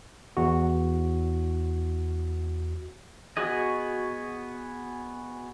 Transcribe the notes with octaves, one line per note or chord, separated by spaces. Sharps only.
E2 F#4
B3 F#4 G#4 D#5